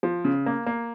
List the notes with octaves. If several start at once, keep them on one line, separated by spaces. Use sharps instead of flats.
F3
C#3
A#3
A#3